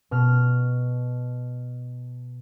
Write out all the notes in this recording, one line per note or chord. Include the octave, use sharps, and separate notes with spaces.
B2 F6